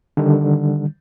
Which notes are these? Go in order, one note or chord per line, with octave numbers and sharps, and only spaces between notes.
D3 D#3 G3